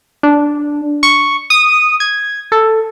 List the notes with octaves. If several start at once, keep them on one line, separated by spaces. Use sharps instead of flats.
D4
C#6
D#6
G#6
A4